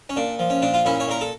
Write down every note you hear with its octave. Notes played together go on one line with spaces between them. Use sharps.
C#4
A#2 D4
F3
C#4
A#2 D4
F4
A#2 C#4 E4
C#5
A#2 A#4
A4